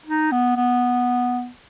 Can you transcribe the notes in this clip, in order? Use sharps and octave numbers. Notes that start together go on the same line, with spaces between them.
D#4
B3
B3